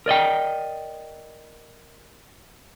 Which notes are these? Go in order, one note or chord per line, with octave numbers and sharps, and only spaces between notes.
A#4 D5 D#5 G5